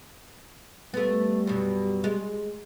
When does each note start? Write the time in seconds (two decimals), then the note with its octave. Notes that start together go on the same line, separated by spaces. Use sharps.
0.94 G3 A3 B3
1.47 F#2 B2
2.04 G#3